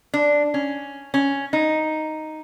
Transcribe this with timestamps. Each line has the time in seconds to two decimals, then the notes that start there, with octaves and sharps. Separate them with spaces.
0.14 D4
0.54 C#4
1.14 C#4
1.53 D#4